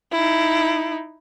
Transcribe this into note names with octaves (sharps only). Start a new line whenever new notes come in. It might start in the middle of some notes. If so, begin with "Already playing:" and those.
D#4 E4